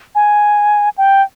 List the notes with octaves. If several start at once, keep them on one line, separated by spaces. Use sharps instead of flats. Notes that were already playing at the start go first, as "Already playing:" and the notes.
G#5
G5